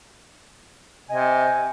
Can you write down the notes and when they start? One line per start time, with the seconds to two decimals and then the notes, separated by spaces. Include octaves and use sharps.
1.10 C3 D#5 G#5